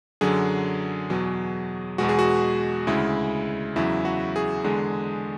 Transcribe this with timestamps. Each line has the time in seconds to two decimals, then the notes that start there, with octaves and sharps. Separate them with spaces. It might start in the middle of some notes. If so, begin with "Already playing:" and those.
0.21 F#2 D3 F#3 G#4
1.10 E2 B2 F#3
1.98 E2 B2 G#3 F#4
2.09 G#4
2.19 F#4
2.87 D2 C#3 G#3 E4
3.76 E2 C#3 F#3 E4
4.05 F#4
4.36 G#4
4.64 E2 D3 G#3